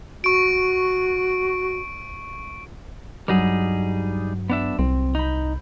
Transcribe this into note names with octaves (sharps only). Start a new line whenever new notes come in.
F#4 C#6 D7
G2 F#3 G3 D#4 G#4
B3 D4 E5
C2 C4
D#4 B5 G6